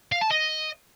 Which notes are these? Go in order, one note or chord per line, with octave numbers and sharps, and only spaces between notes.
F5
A5
D#5